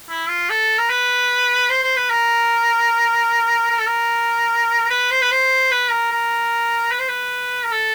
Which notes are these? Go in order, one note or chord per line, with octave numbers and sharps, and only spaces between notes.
E4
F4
A4
A#4
B4
C5
C5
B4
A#4
A#4
A4
A#4
B4
C5
B4
C5
B4
A#4
A#4
B4
C5
B4
A#4
A4